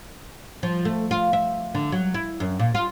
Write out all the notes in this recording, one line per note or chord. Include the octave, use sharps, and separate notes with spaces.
F3
A3
F4
E5
D3
F#3
E4
F#2
A#2
F4